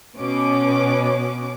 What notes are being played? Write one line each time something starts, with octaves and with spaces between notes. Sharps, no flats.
B2 B3 C#4 D6